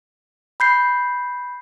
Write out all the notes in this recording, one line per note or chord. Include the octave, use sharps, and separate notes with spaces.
B5 G6 C7